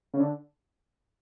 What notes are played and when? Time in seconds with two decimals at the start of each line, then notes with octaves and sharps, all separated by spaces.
0.14 C#3
0.20 D3